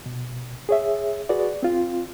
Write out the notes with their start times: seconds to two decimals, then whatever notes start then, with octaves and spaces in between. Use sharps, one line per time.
0.06 B2
0.69 G#4 C#5 E5
1.29 F#4 G#4 B4 D5
1.63 C4 F4